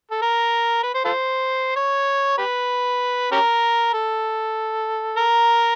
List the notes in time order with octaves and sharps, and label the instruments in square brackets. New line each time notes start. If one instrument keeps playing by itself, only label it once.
[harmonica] A4
A#4
B4
C5
F4 A4 C5
C#5
G4 B4
C#4 G4 A#4
A4
A#4